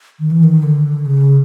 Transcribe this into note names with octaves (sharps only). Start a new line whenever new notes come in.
D#3
E3
D#3
D3
C#3